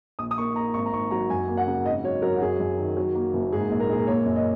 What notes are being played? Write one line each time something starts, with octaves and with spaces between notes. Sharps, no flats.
A#1 D#6
D#6
A#3 C#6
A#3 A#5
G#1 C#6
A#5
G#1 C#6
F#3 A#5
F#2 G#5
A#3
F#5
C#3
G#1 D#5
F#3 C#5
F#3 A#4
F#4
F#2 G#4
F#2
D#3
F#3
A#3
F#1
G#2 G#4
A#1
A#4
A#1 G#4
A#4
A#3 C#5
F#2
D#5